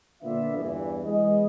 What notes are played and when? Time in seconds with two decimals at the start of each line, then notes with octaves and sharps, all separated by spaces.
0.22 A#2 D3 B3 F4 D5 E5
0.55 E2 G2 E3
1.05 E3 G#3 B3 G#4 D#5